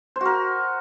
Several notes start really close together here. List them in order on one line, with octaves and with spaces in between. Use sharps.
C5 F#4 A#4